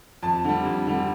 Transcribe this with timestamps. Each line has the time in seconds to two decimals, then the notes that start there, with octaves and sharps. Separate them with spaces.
0.23 F2 A5
0.44 D3 G3
0.66 F2
0.87 D3 G3